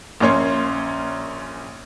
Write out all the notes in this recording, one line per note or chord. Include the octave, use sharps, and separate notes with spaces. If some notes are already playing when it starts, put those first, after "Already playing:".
A#1 A#3 C#4 C#5 C6